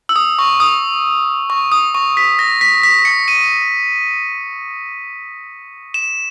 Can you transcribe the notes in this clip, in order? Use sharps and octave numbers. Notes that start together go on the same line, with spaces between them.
E6
D#6
C#6
D#6
C#6
D#6
C#6
B6
A#6
B6
B6
C#7
D#7
E7